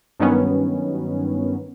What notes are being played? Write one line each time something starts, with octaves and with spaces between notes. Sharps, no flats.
G2 D#3 F#3 B3 C#4